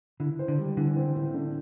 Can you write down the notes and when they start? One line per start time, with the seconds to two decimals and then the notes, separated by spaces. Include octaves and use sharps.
0.20 D3 E4
0.39 C5
0.48 D3
0.58 G3
0.77 D3 E3
0.96 C4
1.15 A2
1.34 D3